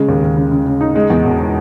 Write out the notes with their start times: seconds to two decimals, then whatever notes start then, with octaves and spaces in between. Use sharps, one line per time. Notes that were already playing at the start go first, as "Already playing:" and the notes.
Already playing: C#3 G#3
0.08 D#2
0.23 D#2
0.37 C#3
0.52 C#3
0.67 C#3
0.81 D#4
0.96 G#3
1.10 E2
1.25 E1